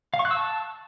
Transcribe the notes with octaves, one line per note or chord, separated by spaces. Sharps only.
F5
C#6
F#6
E6
A5